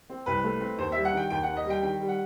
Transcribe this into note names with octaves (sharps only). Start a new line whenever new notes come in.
C4
C2 B4
A3
C4
D#2 C5
G3 E5
F#5
D#3 G5
D#2 G5
D#2 F#5
D#5
G3
G5
D#3 G5
G3
F#5